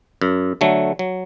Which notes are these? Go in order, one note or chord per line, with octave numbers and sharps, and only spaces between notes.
F#2
D3 F#3 A3
F#3